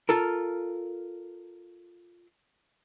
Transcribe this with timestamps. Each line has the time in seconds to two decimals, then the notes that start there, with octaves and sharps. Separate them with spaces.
0.09 F4 A4 A#4